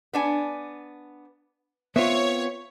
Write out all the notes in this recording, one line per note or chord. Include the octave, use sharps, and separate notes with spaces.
B3 D4 G#5
B3 C4 F4 C#5 E5